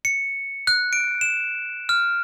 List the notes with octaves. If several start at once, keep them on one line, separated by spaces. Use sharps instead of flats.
C#7
F#6
D7
E7
F6